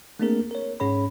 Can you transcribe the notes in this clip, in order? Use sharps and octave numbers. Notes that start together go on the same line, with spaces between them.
A3 A#3 C4 D4 G#4 A#4
A#4 C#5
G#2 C#4 G#4 C#5 B5